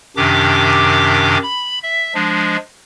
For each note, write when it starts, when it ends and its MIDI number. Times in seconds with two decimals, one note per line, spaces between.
0.17 1.37 42
0.17 1.37 48
0.17 1.37 51
0.17 1.37 62
0.17 1.37 67
0.17 1.37 86
1.43 1.79 83
1.83 2.13 76
2.14 2.57 53
2.14 2.57 56
2.14 2.57 62